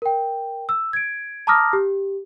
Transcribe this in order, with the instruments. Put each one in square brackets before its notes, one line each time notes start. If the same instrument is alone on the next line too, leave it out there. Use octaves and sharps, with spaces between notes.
[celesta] A#4 G5
E6
G#6 D7
A5 A#5 D6 D#6 F6 A#6
G4